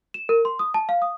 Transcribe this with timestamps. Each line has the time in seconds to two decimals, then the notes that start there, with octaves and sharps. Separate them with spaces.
0.14 E7
0.29 A#4
0.45 C6
0.59 D#6
0.74 A5
0.89 F5
1.02 D#6